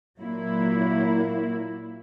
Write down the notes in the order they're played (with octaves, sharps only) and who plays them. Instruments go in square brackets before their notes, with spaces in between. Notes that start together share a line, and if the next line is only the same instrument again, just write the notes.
[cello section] A#2 F#3 A#3 E4